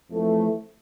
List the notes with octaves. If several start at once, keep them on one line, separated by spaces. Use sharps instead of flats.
F2 E3 A3